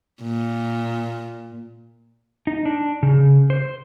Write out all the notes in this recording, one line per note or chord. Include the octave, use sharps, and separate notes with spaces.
A#2
D#4
D4
C#3
C5